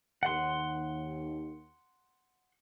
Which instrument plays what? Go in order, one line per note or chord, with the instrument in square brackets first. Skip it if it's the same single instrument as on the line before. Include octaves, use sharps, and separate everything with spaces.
[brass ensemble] D#2 [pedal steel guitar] F#5 C6